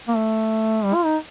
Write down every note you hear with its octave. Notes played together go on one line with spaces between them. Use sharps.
A#3
A3
G3
F4
D#4